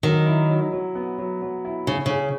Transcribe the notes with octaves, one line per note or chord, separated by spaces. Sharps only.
D#3 F#3
E4
F#3
F#3
B3
F#3
F#3
E4
C#3 C#4
C#3 G#4